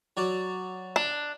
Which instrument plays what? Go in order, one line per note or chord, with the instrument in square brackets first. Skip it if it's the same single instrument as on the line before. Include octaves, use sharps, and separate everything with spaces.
[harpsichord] F#3 F#4 D5
[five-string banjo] D4